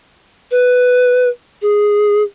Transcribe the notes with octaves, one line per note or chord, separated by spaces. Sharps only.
B4
G#4